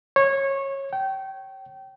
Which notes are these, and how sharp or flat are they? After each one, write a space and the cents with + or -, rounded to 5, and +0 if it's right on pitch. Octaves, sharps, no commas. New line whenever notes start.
C#5 -20
G5 -25